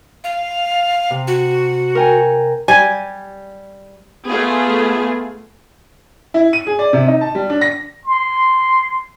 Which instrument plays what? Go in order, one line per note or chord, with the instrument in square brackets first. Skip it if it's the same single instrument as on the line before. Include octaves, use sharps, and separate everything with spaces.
[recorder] F5
[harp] C3
[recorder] F#4
[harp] A#4 G5 G#5
[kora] G3 [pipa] G#5
[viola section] A3 F4 G#4 [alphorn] B3
[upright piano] E4
D#7
G#4
D5
C3
D#4
A5
G3
D4
A#6
[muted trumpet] C6